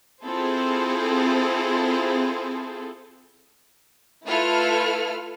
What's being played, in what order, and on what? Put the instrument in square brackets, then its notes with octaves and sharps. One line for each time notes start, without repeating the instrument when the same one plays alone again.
[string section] C4 E4 F4 G#4 A4 C5
[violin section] A3 E4 F4 A4 B4 F6